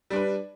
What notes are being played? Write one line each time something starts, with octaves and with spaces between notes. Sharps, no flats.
G3 D4 B4